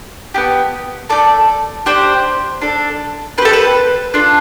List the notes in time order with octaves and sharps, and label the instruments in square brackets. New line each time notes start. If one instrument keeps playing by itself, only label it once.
[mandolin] B3 D4 G4
A3 E4 A4 D5
D4 G4 C5
D4 A4
C4 B4
G4 A4
B4
D4 F4 A4